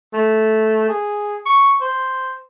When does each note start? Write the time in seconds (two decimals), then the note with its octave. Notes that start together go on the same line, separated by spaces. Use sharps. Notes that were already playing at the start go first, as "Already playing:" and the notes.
0.13 A3
0.89 G#4
1.46 C#6
1.81 C5